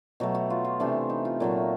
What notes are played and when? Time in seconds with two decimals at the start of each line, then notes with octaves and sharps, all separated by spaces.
0.20 B2 F#3 A3 G4
0.35 F#4
0.50 F4
0.65 F4
0.80 C3 E3 A3 D4
1.10 D#4
1.25 F4
1.40 A#2 F#3 A3